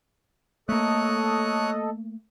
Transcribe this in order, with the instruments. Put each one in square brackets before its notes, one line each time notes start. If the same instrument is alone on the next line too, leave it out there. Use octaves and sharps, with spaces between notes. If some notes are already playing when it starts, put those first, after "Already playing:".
[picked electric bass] A3 A#3 [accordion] A4 D#5 [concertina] C#5 D#6 F#6